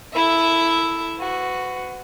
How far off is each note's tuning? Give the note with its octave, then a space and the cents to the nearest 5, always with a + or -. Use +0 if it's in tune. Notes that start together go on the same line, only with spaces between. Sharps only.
E4 +0 A4 +0 E5 +0
F#4 +0 B4 +40